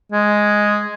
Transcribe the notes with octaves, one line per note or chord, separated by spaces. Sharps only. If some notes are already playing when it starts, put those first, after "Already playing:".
G#3